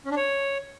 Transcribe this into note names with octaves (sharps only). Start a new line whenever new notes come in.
C#4
D4
C#5